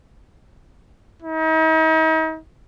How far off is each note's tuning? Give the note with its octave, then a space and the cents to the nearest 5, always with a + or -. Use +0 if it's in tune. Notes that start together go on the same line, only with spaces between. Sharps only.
D#4 +40